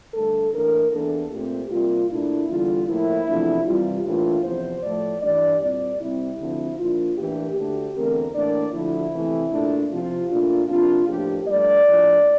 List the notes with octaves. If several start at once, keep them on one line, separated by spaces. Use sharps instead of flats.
G2 D3 A3 A4
A2 E3 A#3 D4 A#4
E2 E3 A#3 D4 A4
A#2 A3 C4 G4
C3 G3 A#3 F4
A#2 A3 D4 E4
E2 D3 G3 F4
A2 F3 A#3 E4
E2 C3 F3 A3 D4
C3 E3 G3 F4
A2 E3 A#3 D4 F4
E2 C3 F3 C5
A2 F3 A3 D5
G2 E3 G3 D4 D5
A#2 G3 C4 D5
C3 G3 C4 E4
D2 D3 F3 C4
A#2 F3 A#3 D4 F4
A2 E3 A#3 D4 G4
D2 D3 A3 D4 G4
E2 D3 A3 C4 A#4
A2 E3 A#3 D4 D5
D2 D3 F3 E4
C3 E3 A3 C4
A#2 A3 D4
C3 F3 C4 F4
A#2 A3 D4 F4
C3 F3 A#3 D4 F4
A2 F3 A#3 D4 G4
G2 F3 A3 D4 D5
A2 F3 A#3 D4